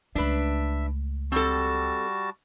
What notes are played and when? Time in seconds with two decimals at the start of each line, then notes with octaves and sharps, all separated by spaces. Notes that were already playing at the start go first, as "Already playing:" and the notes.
0.15 C#2 A3 D4 B4 E5
1.32 G3 C4 F#4 A4 A5